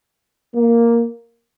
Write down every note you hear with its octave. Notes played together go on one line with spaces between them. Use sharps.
A#3